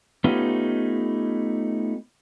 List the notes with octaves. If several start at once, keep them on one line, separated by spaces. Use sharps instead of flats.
A3 B3 C#4 D#4 F4 G4